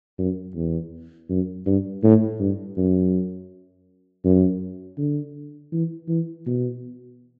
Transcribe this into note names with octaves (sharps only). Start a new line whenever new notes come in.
F#2
E2
F#2
G2
A2
G2
F#2
F#2
D3
E3
E3
B2